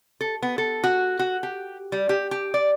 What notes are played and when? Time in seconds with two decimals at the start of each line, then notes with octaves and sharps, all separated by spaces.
0.21 A4
0.43 B3
0.58 A4
0.84 F#4
1.19 F#4
1.43 G4
1.92 G3
2.09 G4
2.31 G4
2.54 D5